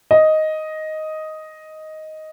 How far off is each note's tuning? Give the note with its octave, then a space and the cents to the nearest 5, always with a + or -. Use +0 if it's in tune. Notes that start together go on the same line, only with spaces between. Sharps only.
D#5 +5